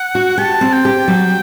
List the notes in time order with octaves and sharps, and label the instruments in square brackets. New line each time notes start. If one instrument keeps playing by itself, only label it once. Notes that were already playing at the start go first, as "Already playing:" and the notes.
Already playing: [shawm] F#5
[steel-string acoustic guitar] F#4
[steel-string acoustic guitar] G4 [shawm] A5
[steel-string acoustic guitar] C4
[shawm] G5
[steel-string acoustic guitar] G4
F#3